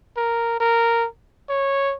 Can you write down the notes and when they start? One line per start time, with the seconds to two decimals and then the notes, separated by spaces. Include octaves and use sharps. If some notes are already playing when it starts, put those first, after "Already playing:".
0.17 A#4
0.60 A#4
1.49 C#5